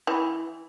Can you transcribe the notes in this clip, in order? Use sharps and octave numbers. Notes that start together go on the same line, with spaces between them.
E3